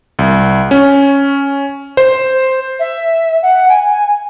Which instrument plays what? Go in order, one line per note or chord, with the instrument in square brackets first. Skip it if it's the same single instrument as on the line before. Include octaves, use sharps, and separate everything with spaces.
[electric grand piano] C2
C#4
C5
[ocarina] E5
F#5
G#5